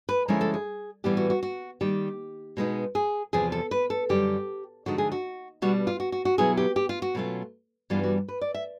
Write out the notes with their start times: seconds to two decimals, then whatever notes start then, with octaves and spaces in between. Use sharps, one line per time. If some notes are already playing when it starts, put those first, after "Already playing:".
0.09 B4
0.28 D3 F3 G#3 C#4 E4 A#4
0.41 A4
0.54 G#4
1.04 A2 E3 G3 B3 G4
1.17 F#4
1.30 F#4
1.43 F#4
1.81 D#3 G3 A#3 G4
2.57 B2 G#3 B3 D#4
2.95 G#4
3.33 E2 C3 F3 G#4
3.52 A4
3.71 B4
3.90 A4
4.09 F#2 D3 G3 G4
4.86 D3 F3 G#3 B3 D#4 F#4
4.98 G#4
5.12 F#4
5.62 B2 G3 B3 D4 F#4
5.87 F4
6.00 F#4
6.12 F#4
6.25 F#4
6.38 B2 F#3 B3 E4 G#4
6.57 G4
6.76 G4
6.89 F4
7.02 F#4
7.15 B2 F#3 A3 C#4 F4
7.90 G2 E3 G3 B3 D4 F4
8.03 F#4
8.29 B4
8.41 D5
8.54 E5